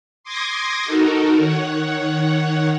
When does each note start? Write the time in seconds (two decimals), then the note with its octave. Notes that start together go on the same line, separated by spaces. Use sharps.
0.24 C6 D6 D#6 G#6 A#6
0.84 D#4 F#4 A4 A#4
1.39 D#3 C#5 F#5